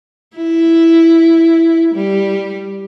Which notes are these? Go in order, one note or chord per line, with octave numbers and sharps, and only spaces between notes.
E4
G3